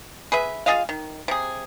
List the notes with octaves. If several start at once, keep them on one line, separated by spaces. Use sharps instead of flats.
G#4 B4 E5
F4 G#4 D#5 F5
D#3
C3 G#4